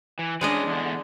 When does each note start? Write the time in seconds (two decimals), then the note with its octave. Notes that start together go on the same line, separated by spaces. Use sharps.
0.19 E3
0.41 G#3 C#4 D4 G#4 B4 D#5
0.67 E2 D3